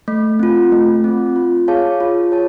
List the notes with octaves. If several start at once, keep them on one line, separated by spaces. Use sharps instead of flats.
A3
C4 F4
A3
C4 F4
F4
G#4 C#5 F5 A5
F4
G#4 C#5 A5